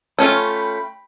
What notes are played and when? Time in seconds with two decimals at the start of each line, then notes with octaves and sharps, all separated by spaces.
0.19 A3 C#4 F4 G5 B5